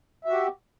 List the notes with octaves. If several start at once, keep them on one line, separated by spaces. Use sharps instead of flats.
F#4 G4 E5